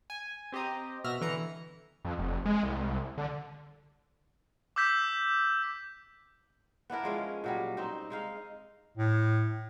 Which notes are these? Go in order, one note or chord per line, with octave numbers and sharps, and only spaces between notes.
G#5
C4 G4 C5 D#5 A#5
B2 F#4 E5 F6 A#6
D3 E3 A#5 C#7
F2
F1
G#3
C2
D3
D6 E6 G6 B6
B3 D4 E4 A#4
F3 G#3 C#4
A#2 F#3 G3
C4 D#4
G#3 D#4 F5
A2